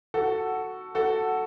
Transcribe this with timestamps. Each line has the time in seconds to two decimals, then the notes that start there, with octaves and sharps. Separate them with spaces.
0.14 F#4 A4
0.95 F#4 A4